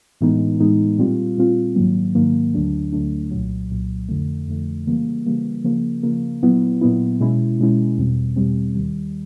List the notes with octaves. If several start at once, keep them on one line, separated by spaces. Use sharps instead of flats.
A2 E3 G#3 B3 D#4
A2 E3 G#3 B3 D#4
A#2 G3 C4 F4
A#2 G3 C4 F4
G#2 D#3 F#3 A#3
G#2 D#3 F#3 A#3
D2 D3 F#3 A3 D4
D2 D3 F#3 A3 D4
C2 A#2 F#3
C2 A#2 F#3
F2 D3 F3 A3
F2 D3 F3 A3
C#3 E3 G3 A#3
C#3 E3 G3 A#3
C#3 F3 A#3
C#3 F3 A#3
A#2 F#3 B3 E4
A#2 F#3 B3 E4
B2 G#3 C#4 E4
B2 G#3 C#4 E4
E2 B2 G3 C4
E2 B2 G3 C4
D#2 D#3 G3